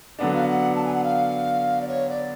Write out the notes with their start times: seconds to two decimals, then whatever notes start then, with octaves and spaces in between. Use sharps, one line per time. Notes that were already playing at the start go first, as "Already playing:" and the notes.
0.19 D3 F#3 B3 D4 F#5
0.33 F5
0.47 F#5
0.75 A5
0.84 G#5
0.94 F#5
1.03 F5
1.81 D5
1.87 C#5
2.09 D5